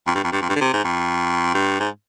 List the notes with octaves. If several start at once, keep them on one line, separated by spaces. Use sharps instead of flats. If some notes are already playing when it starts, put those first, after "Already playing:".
F2
G2
F2
G2
F2
G2
D3
C3
G#2
F2
G2
G#2